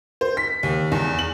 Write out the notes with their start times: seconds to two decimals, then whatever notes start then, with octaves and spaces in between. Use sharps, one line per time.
0.21 C5
0.37 B6
0.63 D#2
0.92 E2
1.19 F#7